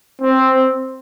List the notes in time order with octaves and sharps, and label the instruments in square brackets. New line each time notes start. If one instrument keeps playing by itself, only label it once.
[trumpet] C4